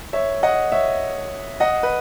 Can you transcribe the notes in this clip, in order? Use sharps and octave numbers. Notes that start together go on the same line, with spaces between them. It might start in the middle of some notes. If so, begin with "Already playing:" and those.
C#5 E5
D#5 F#5
C#5 E5
D#5 F#5
B4